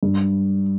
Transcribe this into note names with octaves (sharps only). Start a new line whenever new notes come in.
G2